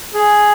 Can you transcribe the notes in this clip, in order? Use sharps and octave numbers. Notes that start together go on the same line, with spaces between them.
G#4